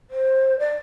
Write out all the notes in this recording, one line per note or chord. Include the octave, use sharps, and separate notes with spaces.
C5
D5